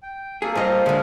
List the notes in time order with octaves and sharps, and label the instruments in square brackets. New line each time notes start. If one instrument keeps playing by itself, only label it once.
[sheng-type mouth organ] G5
[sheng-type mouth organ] A#3 A4 [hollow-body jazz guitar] G#4
[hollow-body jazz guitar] G2 D#5 F5 [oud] C4 F4
[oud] D2 G#3 [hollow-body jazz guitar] D3